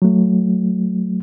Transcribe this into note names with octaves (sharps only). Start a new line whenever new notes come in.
F#3 A3